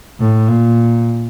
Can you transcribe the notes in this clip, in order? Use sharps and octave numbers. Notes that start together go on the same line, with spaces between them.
A2
A#2